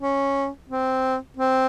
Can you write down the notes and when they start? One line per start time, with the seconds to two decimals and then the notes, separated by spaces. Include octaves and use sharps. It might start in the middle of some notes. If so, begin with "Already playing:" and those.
0.01 C#4
0.70 C4
1.37 C4